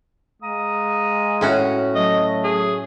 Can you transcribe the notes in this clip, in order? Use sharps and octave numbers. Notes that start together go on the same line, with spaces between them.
G#3 F5 A#5 D#6
A2 C#4 F#4
F#3 A3 D#5
G#4